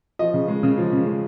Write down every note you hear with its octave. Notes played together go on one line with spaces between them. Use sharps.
F3 D#5
C#3
G#3
C#3
F3
C#3
G#3